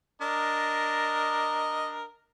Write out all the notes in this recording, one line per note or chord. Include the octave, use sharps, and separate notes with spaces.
D4 A#4 D#5